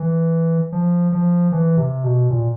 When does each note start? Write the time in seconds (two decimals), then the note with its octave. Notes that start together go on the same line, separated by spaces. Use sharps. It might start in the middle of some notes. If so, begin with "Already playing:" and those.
Already playing: E3
0.72 F3
1.12 F3
1.52 E3
1.77 C3
2.04 B2
2.30 A#2